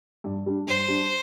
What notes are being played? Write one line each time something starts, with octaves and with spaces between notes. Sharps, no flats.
G2
G3 D4
G2 C5
G3 D4